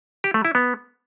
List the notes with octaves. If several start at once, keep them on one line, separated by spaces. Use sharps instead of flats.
G4
A3
E4
B3